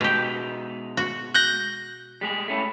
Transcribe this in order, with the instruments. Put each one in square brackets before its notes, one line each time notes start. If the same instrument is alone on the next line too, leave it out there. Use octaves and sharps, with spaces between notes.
[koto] B2 G4 [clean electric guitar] G#3 B3 D#4
[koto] F#4
[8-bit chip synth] F#6 G6 A#6
[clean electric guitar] G3 G#3 G#4
A3 C#4 E4